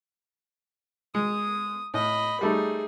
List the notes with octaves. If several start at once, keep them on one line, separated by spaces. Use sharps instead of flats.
G#3 D#6
A2 D#5 B5
G3 A3 D#4 G#4